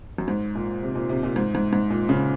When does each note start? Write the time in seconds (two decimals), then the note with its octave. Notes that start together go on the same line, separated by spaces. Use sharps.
0.18 F#2
0.28 G#2
0.55 A#2
0.83 C3
0.95 A#2
1.09 C3
1.23 A#2
1.36 G#2
1.55 G#2
1.73 G#2
1.90 A#2
2.09 C#3